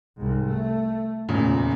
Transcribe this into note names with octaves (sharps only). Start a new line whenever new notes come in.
C2 G#2
A3
D#1 E2 A#2 C#3